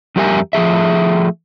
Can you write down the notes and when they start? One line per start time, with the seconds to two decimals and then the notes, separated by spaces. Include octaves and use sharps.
0.16 F2 G3 G4 A#4 E5 G#5
0.53 F3 A3 G#4 E5